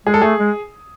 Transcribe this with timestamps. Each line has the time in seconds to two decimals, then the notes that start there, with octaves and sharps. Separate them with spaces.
0.06 G#3 G#4
0.14 A4
0.22 A3 G#4
0.39 G#3